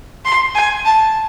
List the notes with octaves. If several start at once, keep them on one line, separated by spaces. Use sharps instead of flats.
C6
G#5
A5